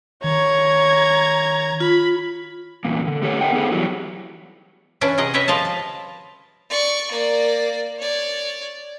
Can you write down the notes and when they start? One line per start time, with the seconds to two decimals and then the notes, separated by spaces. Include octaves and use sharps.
0.24 D#3 C#5 A#5 G#6
1.80 F4 B5
2.85 E2 A#2
3.07 D3
3.22 A3 G4 A4 C#5
3.41 A#4 C5 D#5 F#5 G5
3.53 B3 D#4 G#4 A4 C5
3.72 E3 F#3 G3
5.01 E3 C#4 D4 B4
5.18 C3 G#4 D#5 F#5
5.34 G4 B4 C#5 D#5 E5
5.48 F3 D#5 F5 A5
5.65 A5
6.70 D5 C#6
7.11 A#3 D5
7.98 C#5 D5